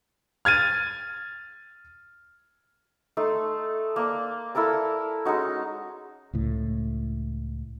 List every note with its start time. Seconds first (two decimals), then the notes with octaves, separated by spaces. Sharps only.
0.45 F6 G#6 A6 D#7
3.17 A3 D#4 A4 C6
3.96 A#3 D5
4.55 E4 A4 A#4 A5
5.25 G#3 C#4 D#4 F#4
6.33 C#2 A2